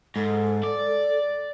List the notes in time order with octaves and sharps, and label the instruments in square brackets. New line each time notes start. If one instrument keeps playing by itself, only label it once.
[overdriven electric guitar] G#2 [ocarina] A4
[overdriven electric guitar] D5